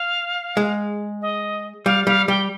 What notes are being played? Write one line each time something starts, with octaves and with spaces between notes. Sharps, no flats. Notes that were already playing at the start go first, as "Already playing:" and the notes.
Already playing: F5
G#3
D#5
G3 F5
G3 F5
G3 G5